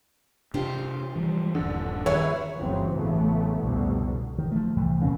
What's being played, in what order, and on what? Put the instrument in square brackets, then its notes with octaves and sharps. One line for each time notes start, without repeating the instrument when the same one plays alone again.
[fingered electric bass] C3 D4 [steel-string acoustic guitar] F4 G4 C5
[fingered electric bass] E3 F3 G3
[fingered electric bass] D#1 G2 [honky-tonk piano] D3
[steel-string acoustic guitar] D#3 F3 G#4 [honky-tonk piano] B4 C#5 E5
[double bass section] G1 D2 C#3 E3 F#3 C4
A1 D2 C#3 E3 A3 B3
C2 F2 B2 D3
[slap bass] D#3
F3 A3
C2 A2 E3 A3
A#2 C#3 C4 C#4